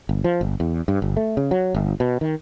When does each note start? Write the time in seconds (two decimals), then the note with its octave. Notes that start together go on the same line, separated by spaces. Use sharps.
0.09 G1
0.24 F3
0.41 G1
0.60 E2
0.88 G2
1.02 G1
1.17 A3
1.37 C#3
1.51 F#3
1.75 G1
2.00 B2
2.21 D#3